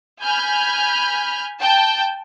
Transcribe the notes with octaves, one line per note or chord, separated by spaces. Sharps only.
G#5 B5 F6 G6
G5 A5